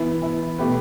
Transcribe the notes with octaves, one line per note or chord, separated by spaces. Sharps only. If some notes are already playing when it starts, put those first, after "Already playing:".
Already playing: E3 B3 E4
E3 B3 E4
B2 A3 G4 B4